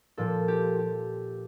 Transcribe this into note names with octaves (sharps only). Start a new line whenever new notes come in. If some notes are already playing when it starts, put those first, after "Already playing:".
A#2 F3 A4
G4
G4